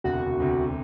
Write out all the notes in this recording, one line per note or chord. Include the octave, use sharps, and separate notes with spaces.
E1 D2 C3 F#4
E1 D2 C3